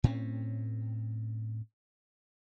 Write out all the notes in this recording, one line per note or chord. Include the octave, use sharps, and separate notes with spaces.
A2 C4 C#4